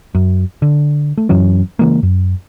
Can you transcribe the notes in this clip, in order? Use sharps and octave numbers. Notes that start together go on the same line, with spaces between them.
F#2
D3
A3
F#2 E3 F#3 C#4
C#3 E3 G#3 A#3
F#2